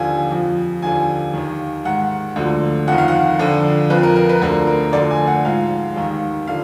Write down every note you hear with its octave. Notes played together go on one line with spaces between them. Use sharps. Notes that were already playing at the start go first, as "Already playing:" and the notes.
Already playing: D#2 D3 F3 G#5
F2 F3
D#2 D3 F3 G#5
D#2 D#3
G#2 D#3 F#5
D2 D3 F3
F2 D#3 F#5
F5
F#5
F2 D3 F3
F2 F3 B4
A#4
A#4
B4
D2 D3 F3 A#4
A#4
D2 D3 F3 D5
G#5
F#5
G#2 F3 F5
D#2 D#3
D3 F3 F5